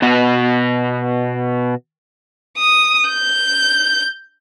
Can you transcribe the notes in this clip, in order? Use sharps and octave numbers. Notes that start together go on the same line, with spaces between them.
B2 B3 F#4
D#6
G6